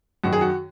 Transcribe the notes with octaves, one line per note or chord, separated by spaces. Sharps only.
F#2 D#3 F#4
G#4
F#4